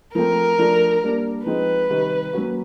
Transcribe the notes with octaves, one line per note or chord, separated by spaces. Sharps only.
F3 A3 C4 A#4
F3 A3 D4
G3 A#3 D4
F3 G#3 C4 D#4 B4
C3 D#3 G3
F#3 A#3 C#4 F#4